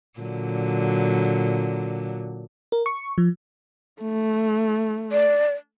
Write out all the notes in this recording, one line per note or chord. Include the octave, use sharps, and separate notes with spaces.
A#2 D3 F#3
A#4
C#6
F3
A3
D5